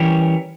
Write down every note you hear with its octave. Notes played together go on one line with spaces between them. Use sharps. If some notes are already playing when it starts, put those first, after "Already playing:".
Already playing: E3 G3 C#4 G4 A#4